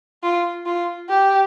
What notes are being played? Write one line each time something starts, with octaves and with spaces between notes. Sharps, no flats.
F4
F4
G4